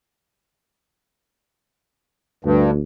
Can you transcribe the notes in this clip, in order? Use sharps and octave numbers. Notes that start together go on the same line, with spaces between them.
D2 G2